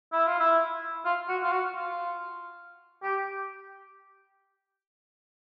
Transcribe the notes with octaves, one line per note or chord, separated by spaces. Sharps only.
E4
F4
E4
F4
F#4
F4
F#4
F4
G4